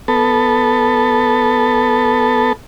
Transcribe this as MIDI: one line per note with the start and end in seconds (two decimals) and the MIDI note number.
0.08 2.53 59
0.08 2.53 69